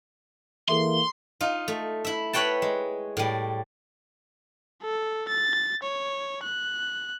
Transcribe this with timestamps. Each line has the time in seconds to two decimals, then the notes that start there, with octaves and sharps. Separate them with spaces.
0.68 E3 A#3 G#4 A4 E5 C6
1.41 D#4 F4
1.68 A3
2.05 E4 E5
2.33 B4 C#5 F#5 G5 A5
2.62 G#3
3.17 A2 G3
4.82 A4
5.28 A6
5.83 C#5
6.43 F#6